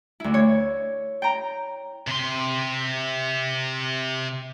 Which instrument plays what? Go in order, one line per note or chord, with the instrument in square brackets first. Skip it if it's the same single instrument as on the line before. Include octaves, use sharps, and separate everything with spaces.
[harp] D2 E4
C#5
G5 A#5
[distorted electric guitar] C3 C6